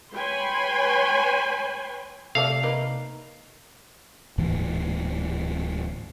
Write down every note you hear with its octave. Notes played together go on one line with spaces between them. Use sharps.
B4 C#5 G5 G#5 B5 C6
C3 A3 A4 D5 F5
A#3 D#4 B4
D1 G#2 E3 A#3